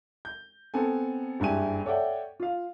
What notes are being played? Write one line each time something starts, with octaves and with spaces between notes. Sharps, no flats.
G6
B3 C4 A4 G#5
F#1 G2 E4 G4 G#5 D#7
A4 C#5 D5 E5 F#5 G5
F4 F5